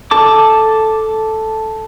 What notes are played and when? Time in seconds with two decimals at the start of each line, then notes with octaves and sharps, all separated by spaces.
0.11 A4 A5 D6